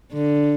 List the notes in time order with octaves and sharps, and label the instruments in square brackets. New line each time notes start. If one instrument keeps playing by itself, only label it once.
[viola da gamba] D3